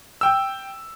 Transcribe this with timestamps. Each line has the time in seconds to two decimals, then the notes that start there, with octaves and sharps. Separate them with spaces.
0.21 G5 E6